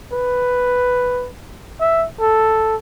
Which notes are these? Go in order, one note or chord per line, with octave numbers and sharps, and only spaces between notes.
B4
E5
A4